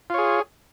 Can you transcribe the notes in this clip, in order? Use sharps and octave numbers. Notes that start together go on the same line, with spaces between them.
F4 G#4 C#5